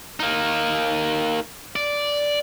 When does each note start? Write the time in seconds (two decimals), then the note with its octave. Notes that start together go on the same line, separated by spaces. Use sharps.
0.20 A#3 D#4
1.76 D5